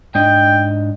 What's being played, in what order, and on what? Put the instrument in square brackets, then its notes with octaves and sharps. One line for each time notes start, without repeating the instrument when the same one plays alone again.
[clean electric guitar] G#2 D4 D#5 [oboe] G5